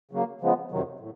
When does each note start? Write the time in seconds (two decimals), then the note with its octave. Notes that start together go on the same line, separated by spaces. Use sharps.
0.11 C#3 F#3 A#3
0.41 C#3 F3 G#3 B3
0.71 F2 C3 D#3 F#3
1.00 A2